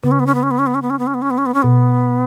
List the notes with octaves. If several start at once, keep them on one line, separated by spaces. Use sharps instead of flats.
C#3 B3
C#4
B3
C#4
B3
C#4
B3
C#4
B3
C#4
B3
C#4
B3
C#4
B3
C#4
B3
C#4
B3
C#4
B2 B3